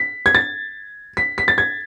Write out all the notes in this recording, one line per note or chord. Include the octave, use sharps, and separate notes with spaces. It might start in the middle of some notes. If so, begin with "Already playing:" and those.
Already playing: B6
G#6
A6
B6
B6
A6
G#6